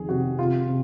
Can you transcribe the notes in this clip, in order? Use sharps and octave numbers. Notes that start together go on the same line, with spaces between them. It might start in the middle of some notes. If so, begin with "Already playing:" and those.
Already playing: F2 D#3 G#4
C3 F#4
C3 F4
C3